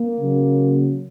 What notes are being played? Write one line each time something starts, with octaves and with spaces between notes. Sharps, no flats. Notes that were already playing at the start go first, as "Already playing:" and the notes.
Already playing: A#3
C#3 F#3